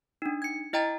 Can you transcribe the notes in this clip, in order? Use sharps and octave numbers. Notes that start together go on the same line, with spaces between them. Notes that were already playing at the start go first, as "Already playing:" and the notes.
D4 D#4
G#6 C#7
E4 D#5 G5 A#5 A6